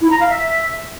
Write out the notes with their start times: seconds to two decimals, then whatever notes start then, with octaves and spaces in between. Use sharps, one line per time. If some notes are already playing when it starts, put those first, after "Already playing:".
0.02 E4
0.11 A#5
0.21 F5
0.30 E5